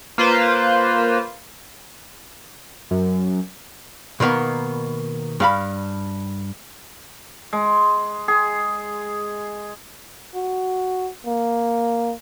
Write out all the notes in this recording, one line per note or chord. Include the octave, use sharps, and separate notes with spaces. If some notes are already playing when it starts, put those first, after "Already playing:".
A#3 F4 B4 C5
F#2
B2 D#3 A#3 B3
G2 F5 B5
G#3
G#4
F#4
A#3